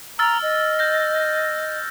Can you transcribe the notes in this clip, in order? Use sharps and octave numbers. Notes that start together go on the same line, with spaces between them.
A#5 E6 F6 A6
D#5
G6 A#6